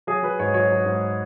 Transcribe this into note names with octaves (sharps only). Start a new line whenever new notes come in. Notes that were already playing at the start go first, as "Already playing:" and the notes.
F#3 G#4
F#3 B4
G#2 C#5
F#3 C#5
F#3
G#2